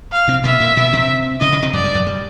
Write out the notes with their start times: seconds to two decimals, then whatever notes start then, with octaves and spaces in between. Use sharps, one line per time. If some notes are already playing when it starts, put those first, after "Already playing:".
0.12 F5
0.28 C3 C4
0.44 B2 B3 E5
0.60 A#2 A#3
0.77 B2 B3
0.93 C3 C4
1.41 C#3 C#4 D#5
1.52 C#3 C#4
1.62 C3 C4
1.73 F#2 F#3 D5
1.84 G2 G3
1.95 F#2 F#3
2.07 G3